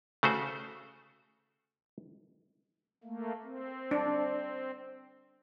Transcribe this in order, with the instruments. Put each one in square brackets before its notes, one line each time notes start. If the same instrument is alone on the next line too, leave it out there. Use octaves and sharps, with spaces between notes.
[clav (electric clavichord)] C#3 A3 F#4 C5
[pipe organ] A3 A#3
C4
[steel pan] D4